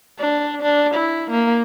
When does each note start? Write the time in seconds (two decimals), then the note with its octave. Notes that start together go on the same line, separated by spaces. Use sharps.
0.19 D4
0.62 D4
0.95 E4
1.31 A#3